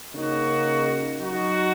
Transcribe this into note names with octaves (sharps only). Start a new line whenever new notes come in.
C#3 A#3 D#4 F#4
F#3 D#4 F#4